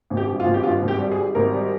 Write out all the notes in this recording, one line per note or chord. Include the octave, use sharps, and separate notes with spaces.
G#1
G4
G2
F4
G#1
G4
G2 F4
G#1
G4
G3
G#4
G3
G#1 A#4
G3